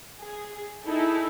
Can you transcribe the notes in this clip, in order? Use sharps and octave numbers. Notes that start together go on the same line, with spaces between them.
G#4
D#4 E4 G#4 A4